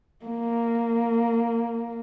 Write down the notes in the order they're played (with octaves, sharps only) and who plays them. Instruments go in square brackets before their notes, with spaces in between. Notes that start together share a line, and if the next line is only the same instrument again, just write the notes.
[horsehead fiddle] A#3